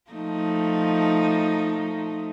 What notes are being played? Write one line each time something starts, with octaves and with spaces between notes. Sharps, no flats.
F3 A3 D#4